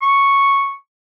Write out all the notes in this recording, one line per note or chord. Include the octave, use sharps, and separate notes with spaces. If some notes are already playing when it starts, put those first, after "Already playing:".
C#6